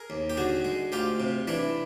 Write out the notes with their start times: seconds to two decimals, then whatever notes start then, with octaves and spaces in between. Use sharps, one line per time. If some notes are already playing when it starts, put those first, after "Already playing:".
Already playing: G#4 A#4
0.10 D#2
0.30 G4
0.37 D3 F#4 G#4
0.65 G#3
0.92 D2 F4 G4
1.20 C3
1.47 E3 D4 E4